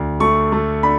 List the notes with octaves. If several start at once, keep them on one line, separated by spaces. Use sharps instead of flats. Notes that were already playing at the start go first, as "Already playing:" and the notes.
Already playing: D2
A3 C#6
A3
D4 B5